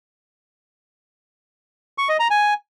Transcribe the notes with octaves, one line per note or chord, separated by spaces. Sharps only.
C#6
D#5
A#5
G#5